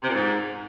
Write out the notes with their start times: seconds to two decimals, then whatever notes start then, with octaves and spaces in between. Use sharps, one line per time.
0.03 C3
0.08 A#2
0.14 G#2